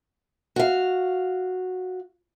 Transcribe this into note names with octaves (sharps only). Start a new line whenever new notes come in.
F#4 F5